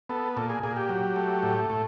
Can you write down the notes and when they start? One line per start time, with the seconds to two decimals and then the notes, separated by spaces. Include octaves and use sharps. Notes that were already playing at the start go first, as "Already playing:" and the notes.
0.09 B3 A4
0.36 A#2 A4
0.50 G#4
0.63 A#2 G#4
0.76 G4
0.89 F#3
1.16 A3
1.43 A2
1.70 A2